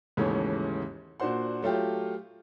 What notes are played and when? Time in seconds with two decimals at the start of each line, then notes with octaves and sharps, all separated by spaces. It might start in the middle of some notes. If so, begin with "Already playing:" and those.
0.17 D#2 G#2 C#3 E3 A3 C#4
1.20 A#2 D4 F#4 C5 F#5 C6
1.63 F#3 A3 F4 G4